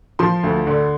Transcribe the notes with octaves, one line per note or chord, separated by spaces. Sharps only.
F3 C6
D2
D3